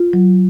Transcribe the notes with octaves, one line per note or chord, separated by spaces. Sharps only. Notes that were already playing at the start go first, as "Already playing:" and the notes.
Already playing: F4
F#3